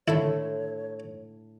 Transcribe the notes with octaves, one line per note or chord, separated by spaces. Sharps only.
A2 D3 D#3 A3 E4 A4 C#5